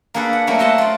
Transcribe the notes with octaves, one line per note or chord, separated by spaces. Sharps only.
A#3 D4 G#4 A4 B4
F#5
F#3 A3 A#3 E4
C5 D#5 E5 F#5 A5
F4 D5